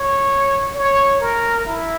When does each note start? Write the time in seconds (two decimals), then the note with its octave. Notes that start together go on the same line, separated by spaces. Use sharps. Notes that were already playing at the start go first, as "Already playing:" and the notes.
Already playing: C#5
0.75 C#5
1.20 A#4
1.66 E4